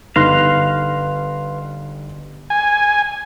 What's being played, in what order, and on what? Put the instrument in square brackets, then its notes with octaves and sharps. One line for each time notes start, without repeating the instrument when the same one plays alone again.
[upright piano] G1 D#4 A#6 [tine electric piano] B4 C6 F#6 [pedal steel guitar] F5
[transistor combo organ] G#5